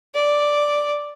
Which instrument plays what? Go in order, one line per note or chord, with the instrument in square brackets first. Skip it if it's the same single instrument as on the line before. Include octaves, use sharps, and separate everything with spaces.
[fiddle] D5